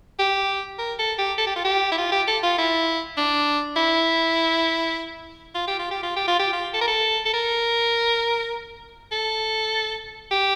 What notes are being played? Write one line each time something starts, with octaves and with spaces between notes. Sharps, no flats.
G4
A#4
A4
G4
A4
G4
F4
G4
E4
F4
G4
A4
F4
E4
D4
E4
F4
G4
F4
G4
F4
G4
F4
G4
F4
A4
A#4
A4
A4
A#4
A4
G4